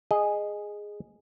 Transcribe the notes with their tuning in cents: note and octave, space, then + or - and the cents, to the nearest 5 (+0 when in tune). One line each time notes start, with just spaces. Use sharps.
G#4 +0 D#5 -15